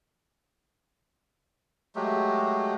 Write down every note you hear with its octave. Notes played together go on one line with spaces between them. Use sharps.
F#3 G#3 A3 G4